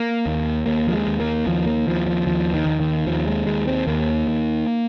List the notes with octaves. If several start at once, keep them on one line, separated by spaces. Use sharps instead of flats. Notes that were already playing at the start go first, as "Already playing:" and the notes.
Already playing: A#3
D#2
D#2 A#3
F3
G#3
D#2
A#3
D#2 F3
A#3
D#2 F3
F3
D#2 F3
D#3
D#2
D#3
D#2 F3
G#3
D#2 G#3
C4
D#2 A#3
D#2